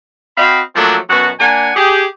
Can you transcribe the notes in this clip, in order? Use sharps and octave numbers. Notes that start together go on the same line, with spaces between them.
C4 F#4 D#5 F5 G5 B5
F3 F#3 A3 A#3 C4 D4
F#2 B2 B3 F#4
A#3 D4 F#5 G#5
G4 G#4